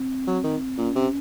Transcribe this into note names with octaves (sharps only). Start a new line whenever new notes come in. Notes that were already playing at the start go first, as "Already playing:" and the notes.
Already playing: C4
F#3
D#3
A#2 C#4
C3